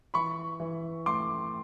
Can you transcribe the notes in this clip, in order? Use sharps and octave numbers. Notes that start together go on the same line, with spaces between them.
E3 B5 C#6
E3
A3 C6 D6